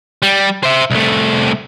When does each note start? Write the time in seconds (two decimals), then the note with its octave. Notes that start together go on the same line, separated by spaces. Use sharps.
0.22 G3
0.63 C5 E5
0.91 C2 A3